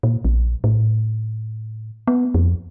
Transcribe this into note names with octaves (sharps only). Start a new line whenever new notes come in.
A#2
A#1
A2
B3
F2